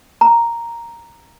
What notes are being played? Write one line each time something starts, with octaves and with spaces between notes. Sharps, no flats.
A#5